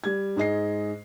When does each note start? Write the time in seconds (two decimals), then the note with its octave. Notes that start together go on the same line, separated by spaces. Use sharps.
0.04 G3 G#6
0.36 G#2 G#3 D#5 C7